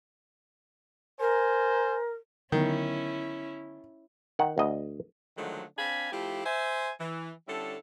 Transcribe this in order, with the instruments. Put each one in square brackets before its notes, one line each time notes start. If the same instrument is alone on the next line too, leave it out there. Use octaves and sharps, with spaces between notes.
[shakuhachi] A#4 [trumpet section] C5 G#5
[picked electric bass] D3 F#3 B3 [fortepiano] D#3 [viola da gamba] C#4 E4
[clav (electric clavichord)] D#3 F#5
D2 D#5
[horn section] D3 D#3 F3 F#3 G#3 A3
C4 D4 F5 G#5 B5
F3 A3 E4 F4 G4
C5 E5 G#5
E3
D3 G3 C#4 E4 A4